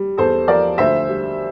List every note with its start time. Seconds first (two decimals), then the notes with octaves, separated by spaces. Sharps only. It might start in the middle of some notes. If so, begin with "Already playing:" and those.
Already playing: G3
0.17 E2 A4 C5
0.48 F3 A#4 D5
0.78 D2 C5 E5
1.08 G3